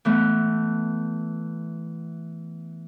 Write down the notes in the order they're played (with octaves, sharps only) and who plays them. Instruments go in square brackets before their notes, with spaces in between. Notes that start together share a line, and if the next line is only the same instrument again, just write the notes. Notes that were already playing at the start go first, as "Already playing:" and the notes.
[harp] E3 A3 B3